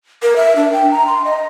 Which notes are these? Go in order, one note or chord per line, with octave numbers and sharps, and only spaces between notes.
A#4
E5
D4
G5
A#5
C6
D#5